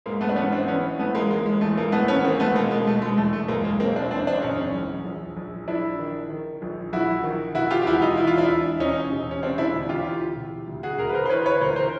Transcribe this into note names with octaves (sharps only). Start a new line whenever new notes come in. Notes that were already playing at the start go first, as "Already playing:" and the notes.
G#2 G#3 A#3
A3 B3
D4
A1 B3 C#4
C4 D4
A1 B3 C#4
A1 A3 B3
G#3 A#3
A1 G#3 A#3
G#3
A1 A3
G#3 A#3
A1 A3 B3
B3 C#4
D#3 A#3 C4
A3 B3
B2 G#3 A#3
G#3 A#3
B2 A3
G#3
E2 A3
A3
F#1 G#3 A#3
G#3 A#3
B2 A#3 C4
C4 D4
E2 C4 D4
C4 D4
F#1 C#4 D#4
E2
A#1
A#1
A#1 D4 E4
D#3
D#3
A#1
A#1 E4 F#4
D#3
C3 E4 F#4
F4 G4
G4
E1 E4 F#4
D#4 F4
E1 E4
F4
D4 E4
E1
E1 C#4 D#4
C3
C#4
E1 C4 D4
D4 E4
D2
F4 G4
E3
C3
D2
F#4 G#4
D2 G#4 A#4
B4
A#4 C5
C5
E3 B4 C#5
B4 C#5
D2 A#4 C5
A#4 C5